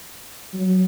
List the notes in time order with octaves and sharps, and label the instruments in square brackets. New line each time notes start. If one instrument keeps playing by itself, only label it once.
[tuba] F#3